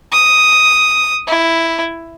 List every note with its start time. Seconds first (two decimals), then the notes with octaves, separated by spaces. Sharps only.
0.12 D#6
1.27 E4